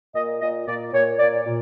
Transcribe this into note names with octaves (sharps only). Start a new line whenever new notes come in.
A#2 D#5
A#2 D#5
A#2 D5
A#2 C#5
A#2 D5
A#2